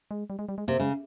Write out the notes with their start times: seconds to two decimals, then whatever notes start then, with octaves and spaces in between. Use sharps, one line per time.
0.11 G#3
0.30 G3
0.39 G#3
0.49 G3
0.58 G#3
0.68 C3 A#3
0.80 C#3 G#3